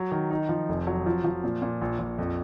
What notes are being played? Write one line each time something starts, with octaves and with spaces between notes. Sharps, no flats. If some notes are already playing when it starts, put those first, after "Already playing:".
Already playing: F#3
D#3
D#4
F3
F1
F#3
F3
F3
A#2
A#2
A#1
A#1
F2